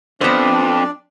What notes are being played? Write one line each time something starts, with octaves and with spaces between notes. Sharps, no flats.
F2 B3 D4 C5 D5